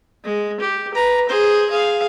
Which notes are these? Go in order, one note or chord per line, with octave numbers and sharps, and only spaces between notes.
G#3
G4
B4 A#5
G#4 C5
G#4 F5